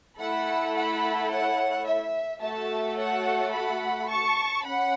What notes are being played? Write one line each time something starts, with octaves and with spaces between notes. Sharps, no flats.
A3 E4 A4 F#5 B5
F#5 B5
C#5 F#5
E5
A3 F#4 A4 E5 A5
C#5 F#5
F#5 B5
A5 C#6
C#4 F#5 B5